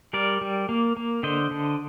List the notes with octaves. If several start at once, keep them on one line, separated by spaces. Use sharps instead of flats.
G3 A#4 D5
G3
A#3
A#3
D3 C5 D#5
D3